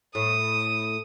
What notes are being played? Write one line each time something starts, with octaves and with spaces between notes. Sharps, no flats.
A2 D#6